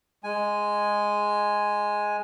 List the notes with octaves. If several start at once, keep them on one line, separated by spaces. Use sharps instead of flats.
G#3 G#5